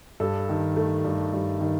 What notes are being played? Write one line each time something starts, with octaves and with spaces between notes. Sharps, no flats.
G2 A4
D#3
A3
G2
G2
D#3